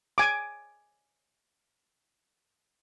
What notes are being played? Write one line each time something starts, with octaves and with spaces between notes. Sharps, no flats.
G#5 D6